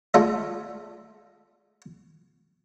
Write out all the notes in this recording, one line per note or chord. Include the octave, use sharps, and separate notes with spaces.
G#3 A3 F4 A4 D5 D#5